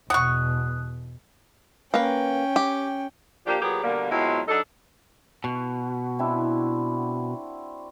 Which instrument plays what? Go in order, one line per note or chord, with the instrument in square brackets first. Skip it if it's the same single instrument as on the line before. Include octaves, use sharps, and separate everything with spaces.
[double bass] E2 B2 [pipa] F#5 C#6 [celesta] D#6 F#6
[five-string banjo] A#3 B4 [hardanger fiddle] C#4 G5
[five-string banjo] G4
[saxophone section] F3 A#3 D4 G4
A#2 F#3 B3 G4 G#4
B2 D3 G3 A#3
B2 F#3 G#3 C4 E4 F4
F#3 D4 D#4 A4
[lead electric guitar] B2 [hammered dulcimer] F#4
[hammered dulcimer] C4 D4 E4